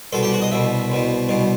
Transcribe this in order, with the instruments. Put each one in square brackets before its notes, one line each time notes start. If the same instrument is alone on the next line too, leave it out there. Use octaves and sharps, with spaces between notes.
[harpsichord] C2 B2 A4
G4
F#4
D#5
C2 B2 E5
C2 B2
C2 B2